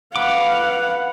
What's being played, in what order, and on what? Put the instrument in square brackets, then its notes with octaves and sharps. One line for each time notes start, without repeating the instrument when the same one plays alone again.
[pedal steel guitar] B4 D6 [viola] F5 [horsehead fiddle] F#5